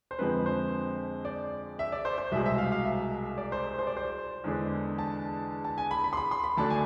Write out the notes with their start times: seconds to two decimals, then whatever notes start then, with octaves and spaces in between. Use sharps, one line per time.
0.11 C5
0.19 F2 D3 F3 G#3 C4 B4
0.46 C5
1.25 D5
1.79 E5
1.92 D5
2.05 C5
2.18 C5
2.31 C2 B2 G#3 E5
2.46 E5
2.58 F5
2.72 F5
2.85 E5
3.38 D5
3.52 C5
3.79 C5
3.87 D5
3.97 C5
4.44 E2 D3 G#3 D4
4.98 A5
5.65 A5
5.78 G#5
5.91 B5
6.04 B5
6.13 C6
6.17 B5
6.31 C6
6.44 B5
6.57 D2 D3 A3 D4 A5
6.70 G#5